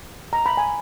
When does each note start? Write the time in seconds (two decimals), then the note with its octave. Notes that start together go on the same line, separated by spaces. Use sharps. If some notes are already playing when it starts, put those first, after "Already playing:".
0.33 A#5
0.46 B5
0.57 G#5